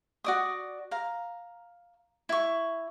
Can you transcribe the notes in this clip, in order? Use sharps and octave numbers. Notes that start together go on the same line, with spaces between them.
F#4 D5 D#6
F5 A#5
E4 C#6